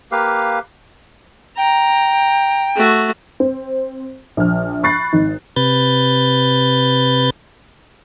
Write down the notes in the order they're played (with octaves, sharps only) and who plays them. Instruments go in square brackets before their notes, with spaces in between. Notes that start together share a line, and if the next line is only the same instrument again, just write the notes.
[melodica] A#3 G4 B4 F5
[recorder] G5 [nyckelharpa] A#5
[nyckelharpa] A3 F#4
[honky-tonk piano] C4
A#1 F6
B5 C#6 F#6 A6 C7
G#1 D#4
[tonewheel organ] C3 B4 G6 A6